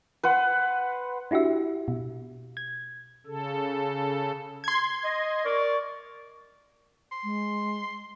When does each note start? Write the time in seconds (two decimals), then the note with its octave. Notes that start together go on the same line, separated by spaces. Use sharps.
0.23 B4 C5 F#5
1.31 D4 E4 F#4 G4 E5
1.88 B2
2.57 G#6
3.26 C#3 A4
4.64 C6 G#6
5.04 D#5
5.44 A#4 D5 C#6
7.11 C6
7.24 G#3